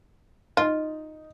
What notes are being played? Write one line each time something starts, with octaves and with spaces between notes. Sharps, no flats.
D#4 F4